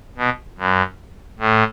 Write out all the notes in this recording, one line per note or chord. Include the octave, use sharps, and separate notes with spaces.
B2
F#2
A2